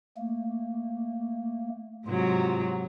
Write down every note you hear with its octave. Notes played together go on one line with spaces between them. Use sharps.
A3 A#3
G#2 C3 F#3 F4